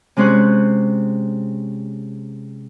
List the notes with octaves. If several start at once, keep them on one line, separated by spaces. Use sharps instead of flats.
C3 G#3 C#4 C5 C#5 F#6